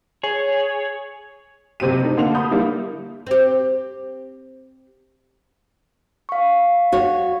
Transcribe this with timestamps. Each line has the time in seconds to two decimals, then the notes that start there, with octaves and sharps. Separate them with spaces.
0.23 G#4 C#5
1.80 F#1 C3 C4 G4 D#7
2.03 A3 D#4
2.17 D3 A#3 C6 F7
2.35 B5 D#6 G6
2.51 G3 A#3 E4
3.27 C4 G4
6.29 F5 C#6
6.92 F#4 C#5